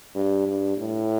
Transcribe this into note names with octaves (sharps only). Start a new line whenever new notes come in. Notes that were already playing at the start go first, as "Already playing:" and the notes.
G2
G2
A2